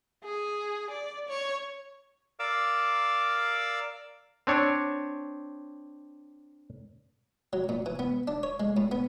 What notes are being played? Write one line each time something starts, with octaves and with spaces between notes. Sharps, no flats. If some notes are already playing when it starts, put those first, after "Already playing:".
G#4
D5
C#5
A#4 D5 F5 D6 E6
C4 D4 C#5
F#3
A#2
E3
B3
D4
C#5
G#3
A2
B3